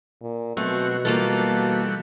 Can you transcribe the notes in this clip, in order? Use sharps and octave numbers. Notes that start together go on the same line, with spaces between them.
A#2
B2 F#3 A3 C4 F#4
E3 G3 A#3 F4 F#4 A4